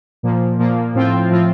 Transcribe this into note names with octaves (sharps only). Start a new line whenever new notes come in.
A#2 F3 A#3
A#2 F3 A#3
A2 F3 C4 F4
A2 F3 C4 F4